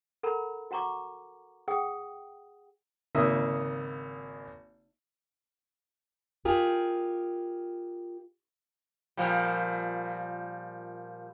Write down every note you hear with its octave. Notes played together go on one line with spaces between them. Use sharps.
A4 A#4 F#5 A#5 B5
F#4 F#5 A#5 C#6 D6
G#4 F#5 G5 D#6
G#1 C#3 A#3 D#4 E5 D#6
F4 G4 G#4 A#4
A#2 F3 G3